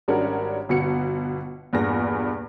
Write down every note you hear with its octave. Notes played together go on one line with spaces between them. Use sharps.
G#1 G3 C#4 D4 F#4 A#4
G1 B2 F#4 C#7
E2 G2 A#2 G#4 A#6